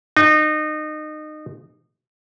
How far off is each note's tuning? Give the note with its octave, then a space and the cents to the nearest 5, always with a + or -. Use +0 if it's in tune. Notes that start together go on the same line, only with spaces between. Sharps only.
D#4 -25